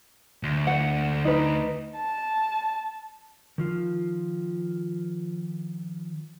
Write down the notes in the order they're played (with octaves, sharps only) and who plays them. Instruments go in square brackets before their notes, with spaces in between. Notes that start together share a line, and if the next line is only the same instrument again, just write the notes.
[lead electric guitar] D2
[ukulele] F#5
D#4 B4
[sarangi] A5
[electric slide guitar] D#3 F3 F4